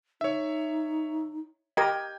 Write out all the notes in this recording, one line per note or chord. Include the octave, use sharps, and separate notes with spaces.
D#4 C#5 E5
G4 A#4 D#5 G5 G#6